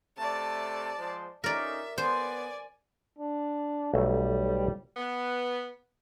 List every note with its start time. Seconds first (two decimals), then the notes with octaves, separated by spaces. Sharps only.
0.17 C3 A3 D5 A5
0.97 F3 G#3 C5
1.44 C#4 D#4 A#4 D5 E5
1.98 B3 C5 D5 G#5
3.19 D4
3.94 B1 G3 A3 E5
4.97 B3